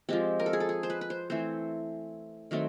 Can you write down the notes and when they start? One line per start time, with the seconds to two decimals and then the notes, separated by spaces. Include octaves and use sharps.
0.09 F3 G#3 C4 G4
0.40 A#4
0.46 A4
0.53 G#4
0.60 A4
0.69 G#4
0.83 C5
0.90 B4
1.01 B4
1.10 C5
1.30 E3 A3 C4 C5
2.51 D#3 F#3 A3 C4